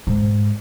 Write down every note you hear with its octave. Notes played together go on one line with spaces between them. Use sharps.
G#2